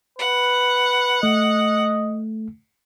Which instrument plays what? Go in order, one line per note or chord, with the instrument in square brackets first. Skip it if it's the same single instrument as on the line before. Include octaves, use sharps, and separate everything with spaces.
[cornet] B4 [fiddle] F#5
[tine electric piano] A3 [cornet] D#5